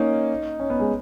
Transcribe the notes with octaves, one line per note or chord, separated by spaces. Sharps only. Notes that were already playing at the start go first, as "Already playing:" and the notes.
Already playing: A#3 C#4 D#4
C#4
B3
G#3